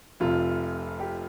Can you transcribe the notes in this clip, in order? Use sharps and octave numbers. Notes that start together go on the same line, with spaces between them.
F1 F2 C3 F4
G4